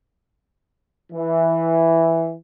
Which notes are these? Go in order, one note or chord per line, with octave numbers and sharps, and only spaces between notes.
E3